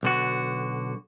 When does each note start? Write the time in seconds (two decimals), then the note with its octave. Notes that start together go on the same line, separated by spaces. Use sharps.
0.03 B1 D3 F#4